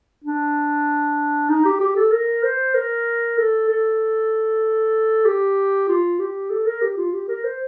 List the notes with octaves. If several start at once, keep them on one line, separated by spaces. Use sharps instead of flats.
D4
D#4
G4
G4
A4
A#4
C5
A#4
A4
A4
G4
F4
G4
A4
A#4
G4
F4
G4
A#4
C5